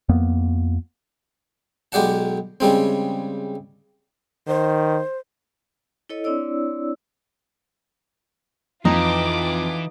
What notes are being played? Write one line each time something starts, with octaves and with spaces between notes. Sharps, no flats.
F2 A#3 B3
B1 G#3 G4 D5 F#5 A5
C#3 G3 G#3 C4
D#3 C5
E4 A4 C#5 D#5
C4 D4 E4 C#5 D5 E6
F2 E3 D#4 F4 B4 D6